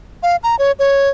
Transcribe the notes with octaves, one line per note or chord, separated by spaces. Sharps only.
F5
A#5
C#5
C#5